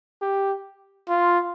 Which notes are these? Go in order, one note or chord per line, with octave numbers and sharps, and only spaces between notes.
G4
F4